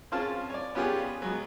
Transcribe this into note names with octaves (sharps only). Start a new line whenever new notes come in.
C4 C#4 F4 G#4 F5 A5
C#5 D5
B3 C#4 F4 G4 G#4
F#3 G#3 B3